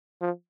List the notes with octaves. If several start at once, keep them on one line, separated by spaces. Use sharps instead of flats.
F3